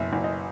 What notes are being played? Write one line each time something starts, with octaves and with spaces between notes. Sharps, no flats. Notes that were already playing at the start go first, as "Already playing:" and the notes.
Already playing: F#1 B2 E5
F#1
D#5